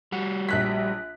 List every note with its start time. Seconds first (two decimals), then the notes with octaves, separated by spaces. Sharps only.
0.12 G3 F#4
0.49 A#1 F#6 B6